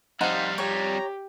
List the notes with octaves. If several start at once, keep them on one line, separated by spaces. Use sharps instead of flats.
F2 G3 D#4 C5 F5 F#5
G4 C#5 A#5